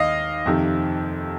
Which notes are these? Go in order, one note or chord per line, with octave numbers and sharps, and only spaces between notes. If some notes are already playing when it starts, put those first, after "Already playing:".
Already playing: D#2 D#3 D#5 F5
F2 C3 D#3